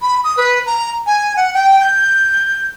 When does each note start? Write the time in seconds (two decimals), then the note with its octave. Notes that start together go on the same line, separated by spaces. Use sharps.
0.02 B5
0.24 D#6
0.37 B4
0.66 A#5
1.06 G#5
1.36 F#5
1.54 G5
1.80 G6